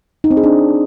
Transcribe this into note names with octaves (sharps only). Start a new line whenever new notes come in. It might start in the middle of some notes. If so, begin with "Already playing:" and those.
D#4
C4
G#4
D4